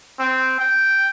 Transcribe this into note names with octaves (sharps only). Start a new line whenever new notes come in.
C4
G5